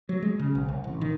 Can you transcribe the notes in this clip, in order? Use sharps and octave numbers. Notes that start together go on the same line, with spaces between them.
F#3
G#3
C#3
B1
C2
A1
D#3